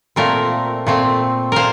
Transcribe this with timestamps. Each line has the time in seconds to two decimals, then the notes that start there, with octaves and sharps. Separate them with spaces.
0.16 A#2 A3 C4 A#4
0.87 A#2 A3 C4
1.52 A#2 A#4 C5